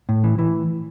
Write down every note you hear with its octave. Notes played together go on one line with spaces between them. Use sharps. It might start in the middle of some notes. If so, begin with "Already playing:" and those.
A2
E3
E3